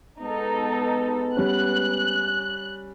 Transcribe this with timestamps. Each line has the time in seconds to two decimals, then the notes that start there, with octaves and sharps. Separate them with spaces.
0.20 G#3 B3 D#4 A4
1.37 G3 C#4 F#6